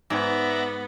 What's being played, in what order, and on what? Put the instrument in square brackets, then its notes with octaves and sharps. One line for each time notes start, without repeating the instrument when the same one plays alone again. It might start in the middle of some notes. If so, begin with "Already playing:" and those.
[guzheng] G#2 [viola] B3 [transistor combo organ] D5 E5 A#5